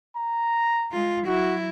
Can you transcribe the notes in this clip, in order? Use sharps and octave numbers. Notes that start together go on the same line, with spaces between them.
A#5
G#3 F4
F#3 E4 F#4